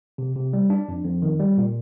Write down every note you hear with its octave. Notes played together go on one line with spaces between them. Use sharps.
C3
C3
G3
D4
F2
F2
D#3
G3
A#2